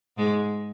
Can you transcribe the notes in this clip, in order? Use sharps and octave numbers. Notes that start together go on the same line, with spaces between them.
G#2 G#3